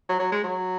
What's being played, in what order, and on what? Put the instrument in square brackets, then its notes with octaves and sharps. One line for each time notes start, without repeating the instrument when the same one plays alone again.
[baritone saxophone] F#3
F#3
G#3
F#3